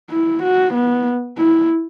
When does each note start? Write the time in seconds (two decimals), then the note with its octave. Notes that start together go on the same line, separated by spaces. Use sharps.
0.10 E4
0.43 F#4
0.74 B3
1.38 E4